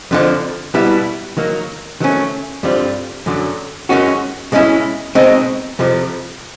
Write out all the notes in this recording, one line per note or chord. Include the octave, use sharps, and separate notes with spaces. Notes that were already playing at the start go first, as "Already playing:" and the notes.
F2 D3 F3
B2 G3 B3 E4
D#3 F#3 A#3
D#3 F#3 A3 C#4
G2 D3 G3 C4 F4
F#2 D3 F#3
F#2 D#3 G#3 C#4 F#4
B2 G#3 C#4 E4
B2 G#3 C4 D#4
F2 C3 F3